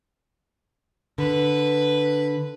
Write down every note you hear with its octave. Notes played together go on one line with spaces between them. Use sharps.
D3 B4